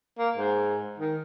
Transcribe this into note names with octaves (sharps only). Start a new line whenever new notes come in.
A#3
G#2
D#3